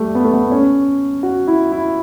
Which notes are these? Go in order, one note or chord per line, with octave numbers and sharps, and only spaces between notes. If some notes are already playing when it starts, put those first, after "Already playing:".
Already playing: G3 A3
B3
A3
B3
C#4
F#4
E4
E4